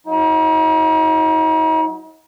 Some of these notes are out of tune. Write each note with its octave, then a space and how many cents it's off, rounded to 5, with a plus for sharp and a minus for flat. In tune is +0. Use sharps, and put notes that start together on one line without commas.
F#3 -20 D#4 +40